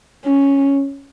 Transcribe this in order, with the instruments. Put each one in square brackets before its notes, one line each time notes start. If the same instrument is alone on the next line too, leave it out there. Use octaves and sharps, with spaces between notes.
[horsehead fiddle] C#4